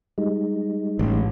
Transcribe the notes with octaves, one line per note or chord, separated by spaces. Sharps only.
G3 G#3 D#4
A1